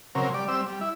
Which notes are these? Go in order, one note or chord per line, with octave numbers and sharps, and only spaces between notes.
C#3 F#3 C4 A#4
G3 D5
G3 C4 E6
G3
E4